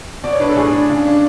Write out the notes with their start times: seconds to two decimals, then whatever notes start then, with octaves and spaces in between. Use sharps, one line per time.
0.24 B2 D5
0.33 C#5
0.40 D4 B4
0.49 A4
0.56 A2 G#4
0.73 D4
0.89 C#3
1.05 D4